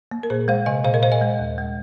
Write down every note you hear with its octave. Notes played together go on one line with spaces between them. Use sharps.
A#3
A#4
A#2 G#4 C5
G#3 C5 F5
C3 D#5 G#5
A#2 C5 F5
A#4 D#5
A#2 C5 F5
D#5 G#5
G#3
D#2
G#3